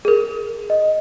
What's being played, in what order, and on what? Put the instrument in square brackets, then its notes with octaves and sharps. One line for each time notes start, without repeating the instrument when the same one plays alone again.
[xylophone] G#4 A#4
[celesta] D#5